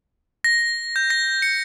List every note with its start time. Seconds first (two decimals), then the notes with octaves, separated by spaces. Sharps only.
0.44 A#6
0.96 G6
1.10 A#6
1.42 C#7